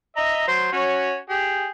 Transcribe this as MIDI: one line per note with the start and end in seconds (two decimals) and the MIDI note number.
0.16 0.47 75
0.16 0.47 76
0.16 0.47 82
0.48 0.68 54
0.48 0.68 72
0.72 1.18 61
0.72 1.18 66
0.72 1.18 73
1.29 1.69 67
1.29 1.69 68